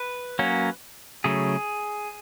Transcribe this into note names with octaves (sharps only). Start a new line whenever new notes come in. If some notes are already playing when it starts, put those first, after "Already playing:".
Already playing: B4
F#3 A#3 C#4
C#3 F#3 A3 G#4